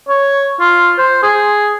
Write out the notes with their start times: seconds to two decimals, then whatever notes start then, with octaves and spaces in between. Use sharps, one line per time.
0.09 C#5
0.61 F4
0.98 C5
1.23 G#4